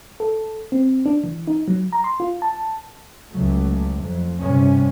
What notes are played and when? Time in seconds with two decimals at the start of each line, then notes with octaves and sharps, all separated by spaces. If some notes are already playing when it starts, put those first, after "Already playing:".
0.20 A4
0.72 C4
1.06 D4
1.24 E3
1.47 D#4
1.68 F#3
1.92 A#5
2.04 C6
2.20 F4
2.42 A5
3.31 C#2 F#3 A3
4.03 F2
4.40 G2 C3 G3 C#4